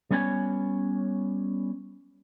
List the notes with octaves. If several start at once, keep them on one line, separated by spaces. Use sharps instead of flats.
G3 B3 C#4 B4 C#5 G#5